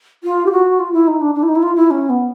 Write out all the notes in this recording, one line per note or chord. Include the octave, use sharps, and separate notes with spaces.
F4
G4
F#4
F4
E4
D#4
D4
D4
E4
D#4
E4
F4
E4
C#4
B3